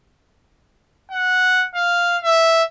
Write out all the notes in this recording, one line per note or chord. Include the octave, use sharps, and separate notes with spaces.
F#5
F5
E5